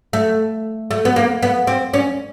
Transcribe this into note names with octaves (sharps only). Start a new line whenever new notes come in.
A3
A3
B3
A#3
B3
C4
C#4